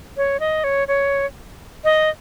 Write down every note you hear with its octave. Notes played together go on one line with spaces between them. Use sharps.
C#5
D#5
C#5
C#5
D#5